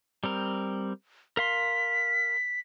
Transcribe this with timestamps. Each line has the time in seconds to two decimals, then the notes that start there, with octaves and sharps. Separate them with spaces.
0.24 G3 C4 A#4
1.37 A#4 F5 C6 B6